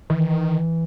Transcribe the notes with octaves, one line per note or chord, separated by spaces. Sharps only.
D#3 E3